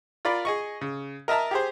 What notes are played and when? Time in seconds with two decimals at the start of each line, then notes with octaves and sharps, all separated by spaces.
0.25 F4 A#4 D5 B5
0.45 G#4 D#5 C#6
0.81 C#3
1.28 A#4 D#5 E5 A5 A#5
1.51 G4 G#4 C5